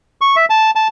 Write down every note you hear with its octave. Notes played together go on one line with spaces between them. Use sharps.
C#6
E5
A5
A5